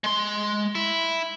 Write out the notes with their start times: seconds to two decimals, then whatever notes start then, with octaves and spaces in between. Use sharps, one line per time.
0.04 G#3 C6
0.75 E4